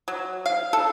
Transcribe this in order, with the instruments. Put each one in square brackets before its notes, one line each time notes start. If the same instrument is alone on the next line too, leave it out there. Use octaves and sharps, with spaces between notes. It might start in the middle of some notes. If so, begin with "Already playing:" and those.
[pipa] F#3
F5
A4